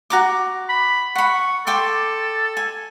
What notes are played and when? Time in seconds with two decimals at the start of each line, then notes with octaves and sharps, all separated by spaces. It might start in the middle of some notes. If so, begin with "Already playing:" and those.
0.10 F#4 A#5 D6
0.69 B5
1.15 F#5 B5 C#6
1.67 A4 G5 C6 D6
2.57 G#5